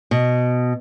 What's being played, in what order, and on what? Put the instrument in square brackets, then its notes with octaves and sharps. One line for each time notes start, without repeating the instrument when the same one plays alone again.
[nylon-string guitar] B2